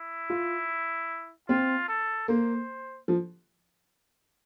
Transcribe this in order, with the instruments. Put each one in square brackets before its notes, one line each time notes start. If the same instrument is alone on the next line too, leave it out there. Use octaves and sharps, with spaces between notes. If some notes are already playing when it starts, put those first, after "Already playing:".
Already playing: [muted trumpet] E4
[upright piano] F4
[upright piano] C4 [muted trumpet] F4
[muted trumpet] A4
[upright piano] A#3 [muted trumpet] C5
[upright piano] F3